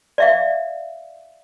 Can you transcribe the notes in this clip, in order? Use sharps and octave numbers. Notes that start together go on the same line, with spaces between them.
D5 E5 F5